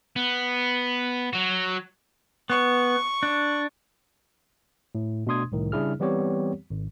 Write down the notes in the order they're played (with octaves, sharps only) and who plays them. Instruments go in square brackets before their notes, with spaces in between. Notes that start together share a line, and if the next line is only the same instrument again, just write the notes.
[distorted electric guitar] B3
F#3 F#4
[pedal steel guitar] B3 [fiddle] C#6
[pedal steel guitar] D4
[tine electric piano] A2
B2 A3 D4 C6 D#6 G#6
C2 A2 D#3
C#3 G3 D4 E4 G#4 F6
E3 G3 B3 C4 G4 C#5
G#1